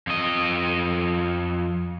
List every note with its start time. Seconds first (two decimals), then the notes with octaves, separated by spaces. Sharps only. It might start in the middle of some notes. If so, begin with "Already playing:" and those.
0.07 F2 D#5